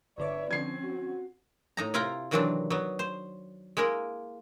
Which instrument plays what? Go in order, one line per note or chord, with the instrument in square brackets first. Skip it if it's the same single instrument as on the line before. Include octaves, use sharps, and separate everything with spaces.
[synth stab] G1 D3 D6 [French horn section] B4 D5 [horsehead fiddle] C#5 E5
[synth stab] D3 F3 [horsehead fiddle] C4 C#4 [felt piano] G#6 C7
[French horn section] F#4
[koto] A2 D#4 A#5
C3 E4 F4 F5 G5 A#5
C3 D#3 E3 F#3 C4 D4
F#3 B3
C5
G#3 A#3 E4 A#4